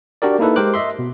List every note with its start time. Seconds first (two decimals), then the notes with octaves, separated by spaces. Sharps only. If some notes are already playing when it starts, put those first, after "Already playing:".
0.22 D4 F#4 G4 A#4 D5
0.39 A#3 D#4 E4 A4 B4
0.56 G#3 G4 A#4 C5 D6 F#6
0.74 D#5 E5 C6
0.99 B2